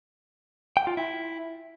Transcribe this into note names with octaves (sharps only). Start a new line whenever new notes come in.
G5
F4
E4